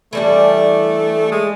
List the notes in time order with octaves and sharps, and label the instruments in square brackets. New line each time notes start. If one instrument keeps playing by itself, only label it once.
[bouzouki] E3 G3 D4 [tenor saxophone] A3
[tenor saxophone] G#3